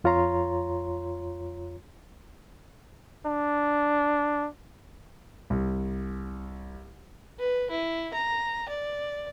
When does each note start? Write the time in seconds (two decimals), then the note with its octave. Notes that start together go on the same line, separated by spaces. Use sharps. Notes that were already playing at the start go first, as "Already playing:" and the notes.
0.04 F2 F4 C#5 A#5 C6
3.26 D4
5.50 C2
7.39 B4
7.71 E4
8.14 A#5
8.69 D5